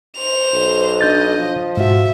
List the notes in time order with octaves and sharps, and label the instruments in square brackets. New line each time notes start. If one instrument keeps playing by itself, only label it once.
[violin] C5 F7
[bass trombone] B1
[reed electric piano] D4 G6 A6 [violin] D#5
[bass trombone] F3
[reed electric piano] G#2 B2 F#4 [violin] E5